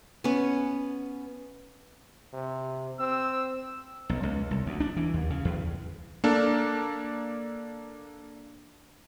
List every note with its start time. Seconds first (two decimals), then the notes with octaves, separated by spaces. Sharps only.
0.24 B3 C#4
2.33 C3
3.00 C4 E6
4.09 B1
4.23 C#2
4.51 C2
4.66 D2
4.80 D4
4.97 E3
5.14 D#2
5.30 C#3
5.45 E2
6.24 A#3 D4 A4